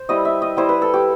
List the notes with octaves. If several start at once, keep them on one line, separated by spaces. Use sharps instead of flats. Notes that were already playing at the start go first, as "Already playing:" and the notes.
Already playing: C5
G3 C4 E4 D#5
E5
D#5
G3 C4 E4 C5
B4
A4
G4